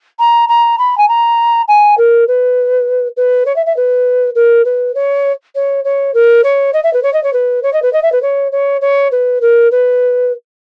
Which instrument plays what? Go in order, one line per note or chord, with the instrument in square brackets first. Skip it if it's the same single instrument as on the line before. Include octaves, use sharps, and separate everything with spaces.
[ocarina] A#5
A#5
B5
G#5
A#5
G#5
A#4
B4
B4
C#5
E5
E5
B4
A#4
B4
C#5
C#5
C#5
A#4
C#5
D#5
E5
B4
C#5
D#5
C#5
B4
C#5
D#5
B4
D#5
E5
B4
C#5
C#5
C#5
B4
A#4
B4